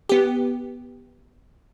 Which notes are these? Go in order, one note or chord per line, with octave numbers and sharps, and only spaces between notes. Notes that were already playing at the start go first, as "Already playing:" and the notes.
B3 G4